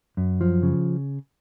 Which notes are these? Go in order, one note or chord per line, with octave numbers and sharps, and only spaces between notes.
F#2
F3
C#3